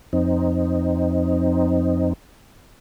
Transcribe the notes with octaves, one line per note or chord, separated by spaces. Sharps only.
F2 C4 D#4